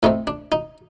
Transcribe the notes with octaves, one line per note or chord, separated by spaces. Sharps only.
A2 A3 C4 D#4
D4
D#4